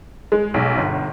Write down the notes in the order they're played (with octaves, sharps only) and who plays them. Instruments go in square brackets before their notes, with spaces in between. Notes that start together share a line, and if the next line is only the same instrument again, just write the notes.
[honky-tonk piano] G#3
B1
G1